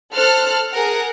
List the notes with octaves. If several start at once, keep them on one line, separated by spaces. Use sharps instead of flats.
A4 C5 F6 F#6
G#4 A#4 F#5